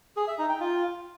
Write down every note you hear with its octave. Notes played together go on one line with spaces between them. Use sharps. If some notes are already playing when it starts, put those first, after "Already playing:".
G#4
E5
D#4
G5
F4